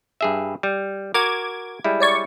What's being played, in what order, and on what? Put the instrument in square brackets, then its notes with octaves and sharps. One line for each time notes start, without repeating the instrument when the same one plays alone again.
[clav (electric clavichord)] G2 G#4 E5
G3
[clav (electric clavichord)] F#4 A#4 [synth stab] D6 G#6
[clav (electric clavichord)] G3 G#3 E4
[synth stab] C#5 D5 C#6